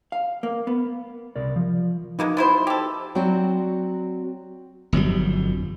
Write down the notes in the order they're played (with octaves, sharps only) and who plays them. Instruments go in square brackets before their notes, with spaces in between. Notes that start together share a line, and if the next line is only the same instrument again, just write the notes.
[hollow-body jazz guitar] F5
A#3
B3
[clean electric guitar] C2 A#4 D5
F3
[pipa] G#3 A#3 B3 [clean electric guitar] D#4 F#4
[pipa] B3 E4 C5
G4 A4
[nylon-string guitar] F#3 C4 F#4 D5 G5
[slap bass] G1 F2 F#3 G3